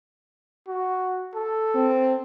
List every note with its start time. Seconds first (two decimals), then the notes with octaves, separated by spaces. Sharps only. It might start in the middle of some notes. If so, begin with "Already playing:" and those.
0.68 F#4
1.35 A4
1.75 C4